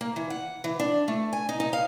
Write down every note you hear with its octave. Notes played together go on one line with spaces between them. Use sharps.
A#3
E3
F#5
E3
D4
A3
G#5
D#4
D#4
F5